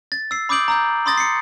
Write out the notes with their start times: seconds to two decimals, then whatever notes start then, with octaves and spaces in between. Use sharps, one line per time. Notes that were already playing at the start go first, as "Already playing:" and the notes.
0.12 A6
0.31 E6 C7
0.49 B5 D6 D#6 G6 D7 F#7
0.68 A#5 E6 G6
1.06 B5 C6 D#6 A6 A#6
1.18 C7 C#7